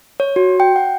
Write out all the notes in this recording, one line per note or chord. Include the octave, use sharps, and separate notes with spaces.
C#5
F#4
G5
F#5